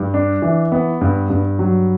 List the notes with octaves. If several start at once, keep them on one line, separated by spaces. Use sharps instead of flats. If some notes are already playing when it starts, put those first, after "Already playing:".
Already playing: G2
D4
E3
B3
G2
G2
F#3